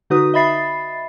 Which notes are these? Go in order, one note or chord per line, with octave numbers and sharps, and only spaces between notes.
D3 D#4 F#4 B4 D#6
D#5 E5 B5 A6 C7